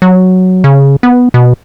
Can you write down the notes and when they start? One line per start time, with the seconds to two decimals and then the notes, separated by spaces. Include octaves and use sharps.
0.02 F#3
0.64 C#3
1.03 B3
1.34 B2